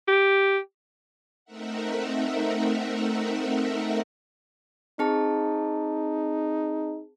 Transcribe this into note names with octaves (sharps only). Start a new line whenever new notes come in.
G4
A3 C4 D#4 A#4 E5 F#5
C4 D#4 G#4 A5